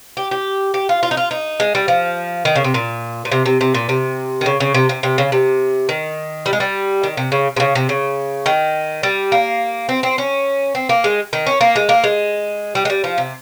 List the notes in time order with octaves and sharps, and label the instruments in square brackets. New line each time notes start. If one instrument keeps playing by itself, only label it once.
[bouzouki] G4
G4
G4
F4
F4
D#4
F4
D#4
G#3
G3
F3
D#3
C#3
C3
A#2
A#2
C3
C3
C3
A#2
C3
D#3
C#3
C#3
C3
C3
C3
C#3
C3
D#3
G3
G#3
G3
D#3
C3
C#3
C3
C#3
C3
C#3
D#3
G3
A#3
C4
C4
C#4
C4
A#3
G#3
D#3
C#4
A#3
G#3
A#3
G#3
G3
G#3
G3
F3
C3